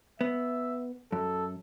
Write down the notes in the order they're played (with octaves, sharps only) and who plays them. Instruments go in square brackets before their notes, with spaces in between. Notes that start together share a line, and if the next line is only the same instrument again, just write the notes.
[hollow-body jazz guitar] B3 [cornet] E5
[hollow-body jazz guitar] F#2 [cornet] A4